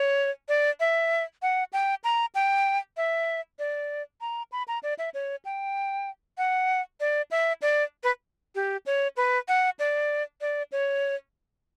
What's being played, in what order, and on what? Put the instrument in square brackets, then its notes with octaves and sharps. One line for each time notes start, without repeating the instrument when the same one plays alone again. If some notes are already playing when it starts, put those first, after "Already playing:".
Already playing: [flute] C#5
D5
E5
F#5
G5
A#5
G5
E5
D5
A#5
B5
A#5
D5
E5
C#5
G5
F#5
D5
E5
D5
B4
G4
C#5
B4
F#5
D5
D5
C#5